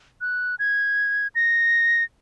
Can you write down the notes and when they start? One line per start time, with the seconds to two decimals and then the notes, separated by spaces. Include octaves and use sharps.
0.21 F#6
0.59 G#6
1.35 A#6